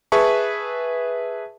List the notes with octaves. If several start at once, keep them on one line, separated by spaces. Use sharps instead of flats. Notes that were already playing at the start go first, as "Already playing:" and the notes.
G#4 B4 E5 A5 C#6